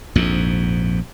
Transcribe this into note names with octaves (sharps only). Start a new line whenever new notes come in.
A#1 F2 G#2